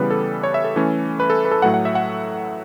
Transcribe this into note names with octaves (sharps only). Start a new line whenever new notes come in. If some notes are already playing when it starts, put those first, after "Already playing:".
Already playing: C#3 E3 G3 B3 B4
A4
C#5
E5
A4
E3 A3 C#4
B4
A4
B4
A4
A2 F#3 A3 F#5
F#5
E5
F#5